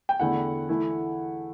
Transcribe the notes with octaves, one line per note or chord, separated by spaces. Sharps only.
G5
E2 D3 A3 E4 F#5
E3 A3 E4